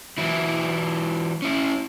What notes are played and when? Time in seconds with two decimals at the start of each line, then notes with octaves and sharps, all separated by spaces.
0.18 E3 F#3 E4
1.42 C#4 E4